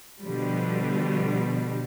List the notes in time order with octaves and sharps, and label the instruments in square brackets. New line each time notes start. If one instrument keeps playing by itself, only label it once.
[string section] B2 D3 F3 G3